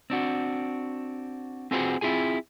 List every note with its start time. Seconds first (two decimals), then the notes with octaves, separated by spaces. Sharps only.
0.10 C4 D4 F#4
1.71 C4 F4 F#4 G#4 B4 C5
2.01 C4 E4 F4 G#4 G#5